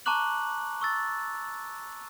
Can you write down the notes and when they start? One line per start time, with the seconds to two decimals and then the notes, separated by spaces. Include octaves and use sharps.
0.06 A5 A#5 C#6 D6 F#6 F#7
0.81 C#6 E6 A6